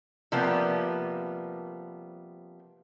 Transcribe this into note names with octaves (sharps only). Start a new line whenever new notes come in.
C3 F3 G3 A#3 B3